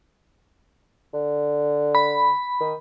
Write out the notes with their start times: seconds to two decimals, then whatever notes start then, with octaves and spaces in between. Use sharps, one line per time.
1.14 D3
1.95 B5
2.60 D#3